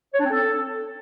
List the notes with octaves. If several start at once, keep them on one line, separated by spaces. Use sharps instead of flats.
C#5
D4
C4
A4